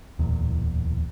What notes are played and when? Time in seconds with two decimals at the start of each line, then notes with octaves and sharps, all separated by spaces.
0.19 D1 E2 A#2